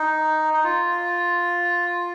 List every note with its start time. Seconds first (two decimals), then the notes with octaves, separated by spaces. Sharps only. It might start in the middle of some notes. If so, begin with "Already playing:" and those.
Already playing: D#4
0.54 D#4
0.64 F4